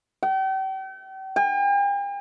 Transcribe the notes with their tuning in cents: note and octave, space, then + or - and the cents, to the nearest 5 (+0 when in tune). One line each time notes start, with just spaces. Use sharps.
G5 -40
G5 +45